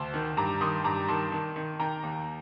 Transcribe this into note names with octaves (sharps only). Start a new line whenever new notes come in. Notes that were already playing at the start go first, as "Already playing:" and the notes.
Already playing: D2 A5 C6
D#3
G2 A#5 D6
D#3 C6 D#6
G2 A#5 D6
D#3 A5 C6
D#3
D#3
D#3 G5 A#5
D#2